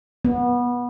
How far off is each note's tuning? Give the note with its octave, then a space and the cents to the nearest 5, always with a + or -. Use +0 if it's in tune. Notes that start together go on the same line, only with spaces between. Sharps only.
B3 -20